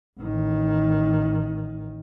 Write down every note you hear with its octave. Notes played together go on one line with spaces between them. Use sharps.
A1 D#3